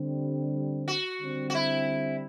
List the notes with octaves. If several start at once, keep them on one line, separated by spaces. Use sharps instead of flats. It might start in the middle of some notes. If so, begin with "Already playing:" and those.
Already playing: D3 G3 C4
F#4
D3 G3 C4
F#4
E4